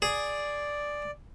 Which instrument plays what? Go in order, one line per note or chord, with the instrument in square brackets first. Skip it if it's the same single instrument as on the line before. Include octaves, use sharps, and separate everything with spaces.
[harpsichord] G#4 [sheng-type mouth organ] D5